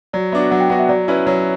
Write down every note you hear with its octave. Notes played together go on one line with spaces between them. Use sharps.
F#3 D5
B3 D4 F#4 E5
F#3 F#5
G5
B3 D4 F#4 F#5
E5
F#3 D5
C#4 E4 B4
F#3 C#5